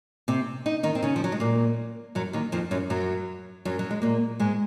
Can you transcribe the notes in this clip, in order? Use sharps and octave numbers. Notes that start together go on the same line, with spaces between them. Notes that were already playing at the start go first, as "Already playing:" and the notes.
C3 C4
D#4
D#3 D#4
C4
C#3 C#4
F3
F#3
G#3
A#2 A#3
F#2 F#3
D#2 D#3
F2 F3
F#2 F#3
F#2 F#3
F#2 F#3
F#3
G#3
A#2 A#3
G#2 G#3